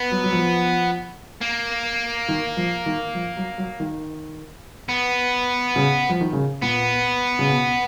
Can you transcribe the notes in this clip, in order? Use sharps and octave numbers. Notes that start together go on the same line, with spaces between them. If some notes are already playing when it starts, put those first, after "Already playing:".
Already playing: B3
F#3
F#3
F3
A#3
D#3
F3
D#3
F3
F#3
F#3
D#3
B3
C#3
F3
D#3
C#3
A#2 B3
C#3
B2